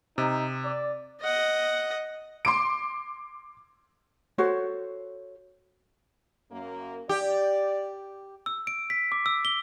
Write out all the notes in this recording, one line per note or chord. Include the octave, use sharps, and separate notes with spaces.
C3 D#4
D5
D#5 F#5
C6 D6 D7
F#4 A4 C5 C#5
F#2 A#3
G4 D5
E6
D7
B6
D6
E6
G7